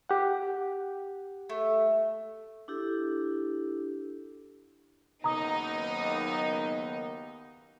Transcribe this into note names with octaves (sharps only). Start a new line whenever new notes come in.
G4 F#5
A3
D4 E4 G4 A4
F#1 D#2 B3 D#4 A#5 D#6